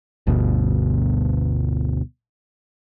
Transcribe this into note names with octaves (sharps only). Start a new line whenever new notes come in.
G1 D2 G2 B2